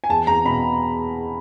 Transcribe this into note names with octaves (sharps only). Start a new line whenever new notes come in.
G#5
E2 A5
E2 A#5
B2 B5